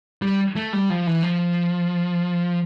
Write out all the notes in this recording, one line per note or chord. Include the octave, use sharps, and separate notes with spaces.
G3
A3
G3
F3
E3
F3